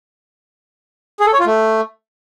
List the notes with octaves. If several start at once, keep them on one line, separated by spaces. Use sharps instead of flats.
G#4
A4
C#5
F4
A3